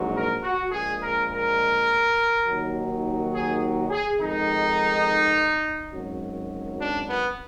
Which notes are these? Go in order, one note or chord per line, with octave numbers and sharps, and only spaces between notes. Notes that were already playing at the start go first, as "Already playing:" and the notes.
Already playing: A#1 G#2 F#3
A#4
F#4
A#1 A#2 G#3 G#4
A#4
A#4
D#2 D#3 F#3
G#4
G#4
F2 D#3 G#3 D#4
G#1 F#2 D#3 F#3
D4
B3